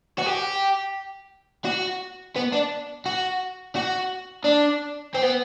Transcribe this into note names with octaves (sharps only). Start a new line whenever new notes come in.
F#4
G4
F#4
B3
D4
F#4
F#4
D4
C4
B3